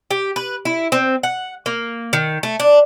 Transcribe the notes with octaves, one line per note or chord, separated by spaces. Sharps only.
G4
B4
E4
C4
F#5
A#3
D#3
A3
D4